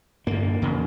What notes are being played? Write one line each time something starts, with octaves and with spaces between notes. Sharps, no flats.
G2 D3 A#3
E2 C#3